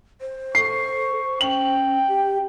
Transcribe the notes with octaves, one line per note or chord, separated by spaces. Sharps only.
C5
A4 C#6 C7
C#4 G5 F#7
G4